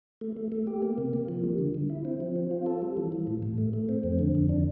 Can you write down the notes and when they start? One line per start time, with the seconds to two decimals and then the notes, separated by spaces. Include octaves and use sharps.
0.21 A3
0.36 A3
0.52 A3
0.67 G4
0.82 A#3
0.98 C3
1.13 A#3
1.28 F3
1.44 G3
1.58 D3
1.74 D3
1.90 E4
2.05 C4
2.20 F3
2.36 C4
2.51 F4
2.66 A4
2.82 G3
2.97 E3
3.12 E3
3.27 A2
3.43 A2
3.58 A3
3.73 A3
3.89 C4
4.03 F2
4.19 D3
4.35 F2
4.49 D4